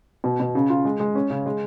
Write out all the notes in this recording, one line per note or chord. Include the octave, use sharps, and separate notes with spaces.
B2
B2
C#3
F4
G#3
G#3
C#4
C#3
G#3